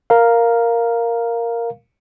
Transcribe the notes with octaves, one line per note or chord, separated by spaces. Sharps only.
A#4 F5